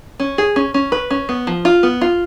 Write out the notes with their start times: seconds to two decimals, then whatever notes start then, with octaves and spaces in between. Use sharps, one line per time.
0.20 C#4
0.38 G#4
0.56 C#4
0.74 C#4
0.92 B4
1.11 C#4
1.29 B3
1.47 F3
1.65 F4
1.83 B3
2.01 F4